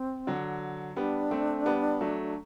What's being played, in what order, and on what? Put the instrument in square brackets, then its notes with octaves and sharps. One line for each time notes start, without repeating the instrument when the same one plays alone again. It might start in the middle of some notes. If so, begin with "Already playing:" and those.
Already playing: [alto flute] C4
[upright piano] D3 F#3
[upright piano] G3 B3 [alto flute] D4
[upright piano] A3 C4
G3 B3
F#3 A3